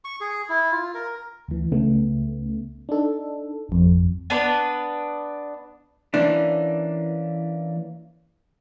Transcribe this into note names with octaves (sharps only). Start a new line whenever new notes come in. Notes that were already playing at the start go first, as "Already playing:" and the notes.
C#6
G#4
E4
F4
A#4
D2 E3
C#2 C#3 A3 B3
D4 D#4 A4
G#1 F2
B3 D4 B4
E3 A#3 C#4 D4